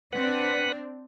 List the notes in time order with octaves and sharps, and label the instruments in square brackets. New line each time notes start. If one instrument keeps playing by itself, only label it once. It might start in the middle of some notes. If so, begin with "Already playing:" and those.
[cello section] C4 D4 [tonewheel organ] B4 F#5